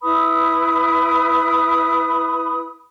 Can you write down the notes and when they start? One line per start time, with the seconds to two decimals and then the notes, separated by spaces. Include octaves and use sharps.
0.02 E4 B4 B5 D#6